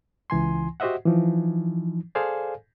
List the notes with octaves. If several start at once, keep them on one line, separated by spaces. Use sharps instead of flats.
C#2 E3 G#5 C6
F#4 G4 C5 D#5 E5 F#5
E3 F3 D#4
G#4 A4 C5 D5 F5 G#5